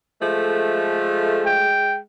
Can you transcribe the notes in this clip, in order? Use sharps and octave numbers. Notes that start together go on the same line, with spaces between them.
F3 G#3 A3
G5